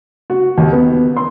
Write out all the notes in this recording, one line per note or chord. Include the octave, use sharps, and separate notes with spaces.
F#4
D#2
B3
C6